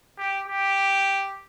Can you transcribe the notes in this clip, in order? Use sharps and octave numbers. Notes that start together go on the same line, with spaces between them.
G4
G4